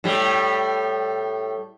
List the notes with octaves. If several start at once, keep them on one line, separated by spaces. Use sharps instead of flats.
A2 G3